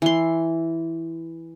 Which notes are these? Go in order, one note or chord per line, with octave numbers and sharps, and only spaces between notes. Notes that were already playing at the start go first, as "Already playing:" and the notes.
E3 C6